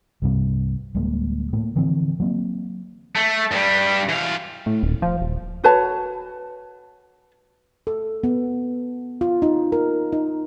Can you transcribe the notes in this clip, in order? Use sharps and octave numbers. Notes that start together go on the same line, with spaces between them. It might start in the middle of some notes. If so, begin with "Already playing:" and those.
C2 G2 C3 G3
D1 G3 G#3 A#3
A2 A3 A#3
D3 E3 F3 C4
F#3 A#3 C4
A3
G2 G3
E3 F5
A2
D#1
F3
D#1
F#4 B4 C#5 A5
A4
B3
F4
D#4
A#4
D#4